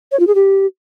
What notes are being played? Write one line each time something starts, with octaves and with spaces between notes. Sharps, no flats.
C#5
F4
G#4
G4